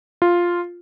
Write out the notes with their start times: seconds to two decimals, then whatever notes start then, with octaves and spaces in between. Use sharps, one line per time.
0.22 F4